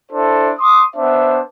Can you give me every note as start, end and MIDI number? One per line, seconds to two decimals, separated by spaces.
0.11 0.51 62
0.11 0.51 64
0.11 0.51 69
0.11 0.51 72
0.58 0.83 84
0.58 0.83 86
0.58 0.83 87
0.96 1.39 59
0.96 1.39 62
0.96 1.39 72
0.96 1.39 76